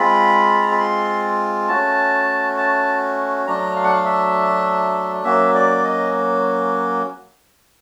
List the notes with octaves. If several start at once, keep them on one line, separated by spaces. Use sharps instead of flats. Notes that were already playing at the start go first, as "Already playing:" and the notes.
Already playing: G#3 C4 F4 B5
A#5
B5
C6
A3 C#4 F#4 A5
A5
F#3 A3 D4 A#5
F5
F#5
F5
E5
F#3 A#3 C#4 F#4 E5
D5
D#5